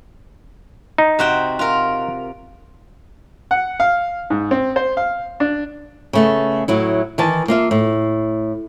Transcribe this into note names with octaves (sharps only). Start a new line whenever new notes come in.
D#4
C3 F#4 G5
F4 A#4
F#5
F5
G#2
C4
C5
F5
D4
C#3 A3 B3
A2 F#3 E4
D#3 E3 A5
A#3 F4 E5
A2